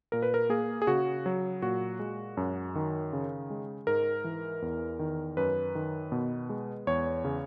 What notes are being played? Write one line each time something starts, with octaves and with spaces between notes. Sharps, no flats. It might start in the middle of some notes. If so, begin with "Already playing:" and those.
A#2 A#4
B4
A#4
A#3 G#4
G#4
C#3 F#4
F#3
A#2 F#4
G#3
F#2
D#3
C#3
G#3
G#2 A#4
E3
E2
D#3
F#2 B4
D#3
B2
G#3
E2 C#5
C#3